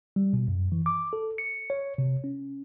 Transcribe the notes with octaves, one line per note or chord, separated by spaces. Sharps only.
G3
B2
F#2
E3
D6
A4
C#7
C#5
C3
C#4